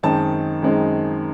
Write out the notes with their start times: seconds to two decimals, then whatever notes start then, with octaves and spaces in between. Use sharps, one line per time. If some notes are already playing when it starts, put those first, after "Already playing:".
0.03 F#2 D#3 G#3 C4 D#4 A5
0.62 F#2 D#3 G#3 C4 D#4